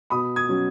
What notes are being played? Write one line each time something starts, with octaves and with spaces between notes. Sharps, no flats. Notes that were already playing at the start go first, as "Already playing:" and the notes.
B2 B5 D#6
D#6 G#6
F#3 C#4